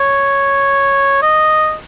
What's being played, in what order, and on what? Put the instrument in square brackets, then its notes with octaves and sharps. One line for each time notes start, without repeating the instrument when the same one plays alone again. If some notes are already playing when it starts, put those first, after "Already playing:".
Already playing: [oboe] C#5
D#5